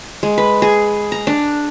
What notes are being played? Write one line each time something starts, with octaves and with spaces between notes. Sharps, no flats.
G#3
B4
G#4
A#5
D4